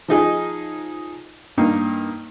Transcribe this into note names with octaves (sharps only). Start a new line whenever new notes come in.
F3 D#4 G#4 D#5
G2 A#3 D#4